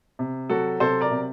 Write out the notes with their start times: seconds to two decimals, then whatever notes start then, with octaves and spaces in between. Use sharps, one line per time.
0.19 C3
0.50 F#3 F#4 A4
0.80 C3 A4 C5
1.01 A#4 D5
1.11 C3